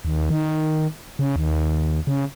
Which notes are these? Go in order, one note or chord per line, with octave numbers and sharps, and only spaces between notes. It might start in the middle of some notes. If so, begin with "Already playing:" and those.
D#2
D#3
C#3
D#2
C#3